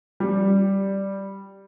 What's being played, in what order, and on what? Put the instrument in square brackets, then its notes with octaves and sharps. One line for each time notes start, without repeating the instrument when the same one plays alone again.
[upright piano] G3